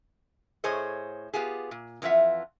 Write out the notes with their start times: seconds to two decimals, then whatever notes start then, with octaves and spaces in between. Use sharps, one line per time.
0.64 A2 G#4 C5 C#5 D#5
1.34 B3 F4 G4 G#4
1.71 A#2
2.02 F2 E3 C4 F4 E5 F#5